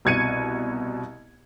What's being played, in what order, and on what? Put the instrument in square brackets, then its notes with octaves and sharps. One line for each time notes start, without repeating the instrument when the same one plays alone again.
[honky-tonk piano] C2 B2 G#6 C#7 D#7